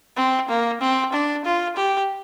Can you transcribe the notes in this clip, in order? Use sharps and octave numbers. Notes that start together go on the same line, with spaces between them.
C4
A#3
C4
D4
F4
G4